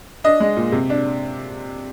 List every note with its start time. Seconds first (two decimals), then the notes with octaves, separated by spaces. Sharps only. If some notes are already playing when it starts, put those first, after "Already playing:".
0.24 D4 D#5
0.40 G#3
0.57 A#2
0.72 C3
0.90 D4